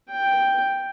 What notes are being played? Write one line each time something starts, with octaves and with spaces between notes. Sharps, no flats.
G5